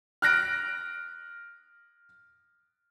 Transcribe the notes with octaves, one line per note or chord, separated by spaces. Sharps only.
F6 F#6 A#6 D7